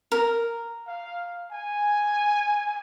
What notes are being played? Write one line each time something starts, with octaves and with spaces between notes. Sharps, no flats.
A#4
F5
G#5